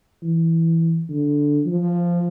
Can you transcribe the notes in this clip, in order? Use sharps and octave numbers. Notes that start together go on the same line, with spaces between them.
E3
D3
F3